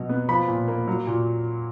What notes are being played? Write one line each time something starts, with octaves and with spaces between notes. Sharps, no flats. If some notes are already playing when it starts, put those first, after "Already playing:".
Already playing: B2 F#3
B3
F3 B5
A#2
A#3
F#3
A#2